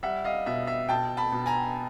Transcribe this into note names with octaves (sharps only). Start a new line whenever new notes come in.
G3 E5 F#5
D#5 F5
B2 E5
E5
B2 G5 A5
A5 B5
B2
G#5 A#5